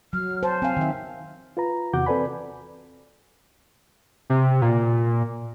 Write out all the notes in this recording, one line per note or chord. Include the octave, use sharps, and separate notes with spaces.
F#3 F6
C5 A5
C4 F5 G#5
D#3 E5
F4 B4 A#5
E2 C3 F#4 F#5 D6 G6
C4 A4 B4 D5 G#5 B5
C3
A#2